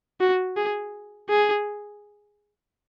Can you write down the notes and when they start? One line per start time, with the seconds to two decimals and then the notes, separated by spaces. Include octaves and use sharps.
0.20 F#4
0.57 G#4
1.29 G#4